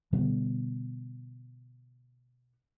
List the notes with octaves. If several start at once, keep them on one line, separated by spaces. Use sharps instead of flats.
B2 D3 G3 B3